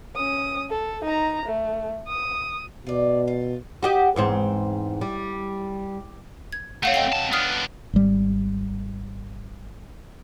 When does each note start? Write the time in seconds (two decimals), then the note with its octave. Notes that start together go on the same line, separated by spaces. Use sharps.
0.16 C#4 D#6
0.70 A4
1.04 D#4 A#5
1.45 A3
2.07 D#6
2.87 B2 F4 D5
3.27 F4
3.83 F#4 G4 D#5
4.16 E2 G#2 C4
5.01 G3
6.53 G#6
6.83 A3 C4 C#5 F5 F#5
6.94 D#5 G5 C7
7.13 C3 A5
7.33 B3 D4 D#6 F6 C7
7.93 G#1 G3